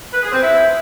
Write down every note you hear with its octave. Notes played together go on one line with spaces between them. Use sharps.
B4
G#4
C4
E4